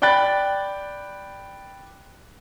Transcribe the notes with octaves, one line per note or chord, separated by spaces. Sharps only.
D5 G5 B5 F#6 A6